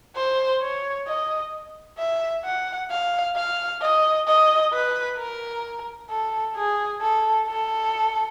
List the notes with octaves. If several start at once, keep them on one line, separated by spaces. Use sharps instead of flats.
C5
C#5
D#5
E5
F#5
F5
F5
D#5
D#5
B4
A#4
A4
G#4
A4
A4